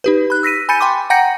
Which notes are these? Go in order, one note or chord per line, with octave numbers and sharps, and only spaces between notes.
D#4 G4 B4
B5 F#6
E6 A#6 B6 D#7
G#5 B5 G6 A6 C#7 D#7
G5 B5 C6 D6
F#5 G5 A#5 G6 A#6 C#7